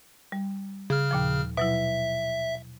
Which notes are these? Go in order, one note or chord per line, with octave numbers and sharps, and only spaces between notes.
G3
C#3 G#4 F6
D#2 A#2 F3
B2 F#3 E4 E5